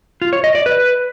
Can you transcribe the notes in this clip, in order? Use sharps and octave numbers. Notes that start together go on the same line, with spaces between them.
F4
C#5
D#5
D5
B4